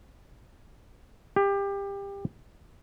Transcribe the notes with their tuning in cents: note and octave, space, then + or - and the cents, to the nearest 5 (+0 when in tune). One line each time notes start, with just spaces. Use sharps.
G4 +25